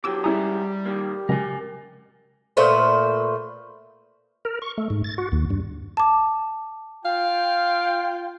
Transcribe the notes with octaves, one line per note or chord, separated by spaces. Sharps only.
B2 E3 F#3 G4 D6 E6
G#2 G3 C#4 E4 G#4 E5 A#5
A#2 D#3 A#3 G4
C#3 F#3 G#3 A#4 G#5
A#2 A3 B4 C5
A#4
C#6
A3
G#2
A6
F#4
D#2
G2
A5 D6
F4 F5 G5